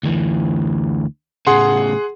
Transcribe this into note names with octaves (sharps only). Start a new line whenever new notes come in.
D2 E3
A2 C#3 G#4 F#5 C6